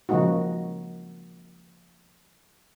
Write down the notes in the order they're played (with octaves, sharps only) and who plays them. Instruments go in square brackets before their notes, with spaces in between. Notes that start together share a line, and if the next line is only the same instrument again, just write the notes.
[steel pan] C#3 F3 G#3 A#3 D#4 F#4